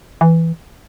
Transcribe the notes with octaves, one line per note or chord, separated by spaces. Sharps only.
E3